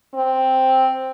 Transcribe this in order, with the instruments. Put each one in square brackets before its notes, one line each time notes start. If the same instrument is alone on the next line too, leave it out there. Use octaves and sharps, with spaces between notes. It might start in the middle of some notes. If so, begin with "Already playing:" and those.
[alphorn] C4